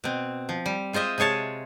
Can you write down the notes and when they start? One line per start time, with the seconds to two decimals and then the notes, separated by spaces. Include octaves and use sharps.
0.04 B2 C4
0.49 F3
0.66 G3
0.93 G#3 F4 C5 D#5 E5
1.18 C3 G#3 G#4 C#5 A5